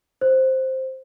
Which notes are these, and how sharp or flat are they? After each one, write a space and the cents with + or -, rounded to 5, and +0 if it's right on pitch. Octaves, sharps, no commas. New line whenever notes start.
C5 +5